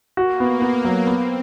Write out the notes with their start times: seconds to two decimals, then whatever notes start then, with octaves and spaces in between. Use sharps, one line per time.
0.17 A#3 F#4
0.40 B3
0.62 B3
0.84 F#3
1.07 B3 C4